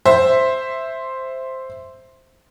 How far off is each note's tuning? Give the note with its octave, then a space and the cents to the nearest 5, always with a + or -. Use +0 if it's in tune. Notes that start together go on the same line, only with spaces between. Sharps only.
C5 +0 E5 +0